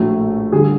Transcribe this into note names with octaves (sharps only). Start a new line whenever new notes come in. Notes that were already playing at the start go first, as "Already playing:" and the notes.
Already playing: A#1 A2 F#3 A3
D3 G3 G#4